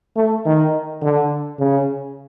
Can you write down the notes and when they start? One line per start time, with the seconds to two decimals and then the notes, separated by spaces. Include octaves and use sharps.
0.16 A3
0.46 D#3
1.02 D3
1.59 C#3